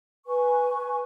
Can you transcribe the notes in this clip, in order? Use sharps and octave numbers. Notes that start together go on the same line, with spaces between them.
B4 G#5 C#6